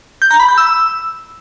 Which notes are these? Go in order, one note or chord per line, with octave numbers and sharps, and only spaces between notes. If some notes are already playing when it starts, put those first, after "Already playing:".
G6
A#5
B5
G6
E6